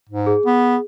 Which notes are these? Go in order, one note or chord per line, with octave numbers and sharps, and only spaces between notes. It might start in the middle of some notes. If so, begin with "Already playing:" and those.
G#2
G#4
B3